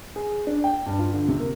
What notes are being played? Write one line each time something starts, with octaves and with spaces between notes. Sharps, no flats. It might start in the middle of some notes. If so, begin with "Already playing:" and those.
G#4
D4
G5
G2
F4
D3
C3
A#3